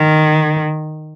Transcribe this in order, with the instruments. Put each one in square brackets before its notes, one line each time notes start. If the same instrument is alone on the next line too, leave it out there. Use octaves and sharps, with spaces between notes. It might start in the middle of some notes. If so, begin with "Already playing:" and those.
Already playing: [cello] D#3